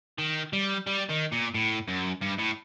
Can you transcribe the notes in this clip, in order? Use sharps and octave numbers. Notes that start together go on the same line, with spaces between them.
D#3
G3
G3
D#3
A#2
A2
F#2
G2
A2